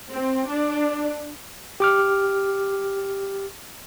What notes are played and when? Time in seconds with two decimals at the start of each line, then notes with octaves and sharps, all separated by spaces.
0.12 C4
0.49 D4
1.80 G4 D6 F6